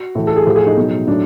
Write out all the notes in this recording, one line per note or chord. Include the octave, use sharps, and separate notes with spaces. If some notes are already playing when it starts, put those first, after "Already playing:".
Already playing: F#4
A2 E3
A4
G#4
A2 F3 G4
G#4
D#4
B2 F#3
A2 F#3 D4